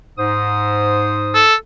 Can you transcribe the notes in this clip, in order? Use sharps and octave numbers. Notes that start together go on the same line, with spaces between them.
G#2 C5 D#6
A4